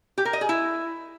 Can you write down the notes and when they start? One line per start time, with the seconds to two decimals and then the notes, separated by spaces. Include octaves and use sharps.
0.18 G4
0.25 A#4
0.33 D#5
0.41 G#4
0.49 E4